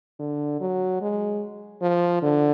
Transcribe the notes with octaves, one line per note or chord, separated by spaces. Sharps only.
D3
F#3
G#3
F3
D3